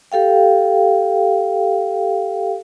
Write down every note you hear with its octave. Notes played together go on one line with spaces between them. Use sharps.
G4 A4 F5 G5